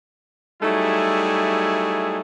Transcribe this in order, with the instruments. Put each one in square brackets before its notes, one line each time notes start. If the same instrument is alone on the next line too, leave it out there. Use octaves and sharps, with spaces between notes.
[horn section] F#3 G3 A3 D#4 E4 G#4